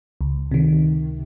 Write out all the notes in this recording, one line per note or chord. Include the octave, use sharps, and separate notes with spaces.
C#2
C3 D#3